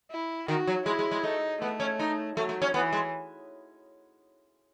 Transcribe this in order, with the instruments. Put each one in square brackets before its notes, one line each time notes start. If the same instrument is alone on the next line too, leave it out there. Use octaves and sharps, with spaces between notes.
[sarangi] E4
[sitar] D#3 [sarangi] F#4
[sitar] F#3
[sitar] G#3 [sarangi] E4
[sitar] G#3
G#3
[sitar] A3 [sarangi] D#4
[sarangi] A3 [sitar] B3
[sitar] C#4
D#4
[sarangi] F#3 [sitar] A3
[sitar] A3
C#4
[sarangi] E3 [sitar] B3
[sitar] G#3